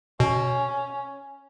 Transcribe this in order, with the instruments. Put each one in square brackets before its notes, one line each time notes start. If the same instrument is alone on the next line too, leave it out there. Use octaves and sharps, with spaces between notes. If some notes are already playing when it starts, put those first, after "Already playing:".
[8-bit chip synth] B2 [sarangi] C#4